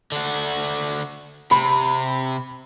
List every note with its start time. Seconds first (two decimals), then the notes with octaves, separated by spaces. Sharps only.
0.12 D3 F#4
1.51 C3 B5